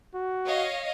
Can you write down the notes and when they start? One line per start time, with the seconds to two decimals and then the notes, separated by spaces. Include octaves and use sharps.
0.15 F#4
0.45 C#5 D#5 F5